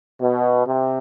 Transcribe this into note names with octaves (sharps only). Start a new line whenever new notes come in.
B2
C3